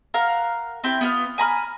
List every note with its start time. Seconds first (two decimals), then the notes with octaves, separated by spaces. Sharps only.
0.14 A#4 F5 F#5
0.84 C4 E4 G4
1.01 B3 E4 F4
1.38 G#5 A#5 B5 F6